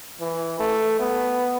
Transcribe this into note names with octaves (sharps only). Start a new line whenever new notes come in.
E3
A3
B3